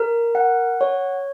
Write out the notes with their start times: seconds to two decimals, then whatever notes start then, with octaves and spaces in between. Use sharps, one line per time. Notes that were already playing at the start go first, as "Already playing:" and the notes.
Already playing: A#4
0.35 F#5
0.81 C#5